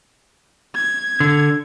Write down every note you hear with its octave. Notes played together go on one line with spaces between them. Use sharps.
G#6
D3